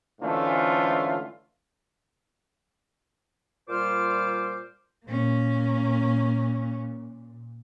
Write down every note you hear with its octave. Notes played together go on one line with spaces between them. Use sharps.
G#2 D3 E3 A3 C#4 F4
A#2 G3 F4 C5 D6 F6
A#2 A#3 C#4